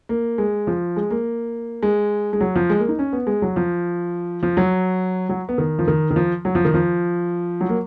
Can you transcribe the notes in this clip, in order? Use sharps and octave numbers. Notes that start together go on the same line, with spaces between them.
A#3
G#3
F3
G#3
A#3
G#3
G#3
F#3
F3
G#3
A#3
D#4
C#4
B3
G#3
F#3
F3
F3
F#3
F#3
B3
D#3
F3
D#3
D#3
F3
F#3
F3
D#3
F3
F#3
A#3